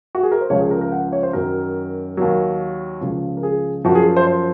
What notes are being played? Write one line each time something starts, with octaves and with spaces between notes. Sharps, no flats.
F#4
G#4
A#4
C5
C#2 C#3 F3 C#5
G#4
A#4
A#4
F#5
C#5
C5
F#2 D#3 F#3 A#4
D#2 D#3 F#3
C#2 C#3 F3
A#4
G#4
F#2 F3 F#4
G#4
C5
C5